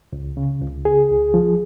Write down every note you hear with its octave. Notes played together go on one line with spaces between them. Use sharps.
C#2
C#3
C#2
C#3 G#4
C#2
F3